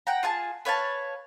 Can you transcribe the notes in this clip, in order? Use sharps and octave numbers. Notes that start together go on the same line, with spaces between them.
F#5 G5 A#5
F4 G#4 A5
B4 C#5 F5 A5